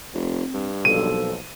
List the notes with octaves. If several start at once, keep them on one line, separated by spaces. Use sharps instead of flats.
F1 C4
G2
B1 A#2 F3 A4 D#7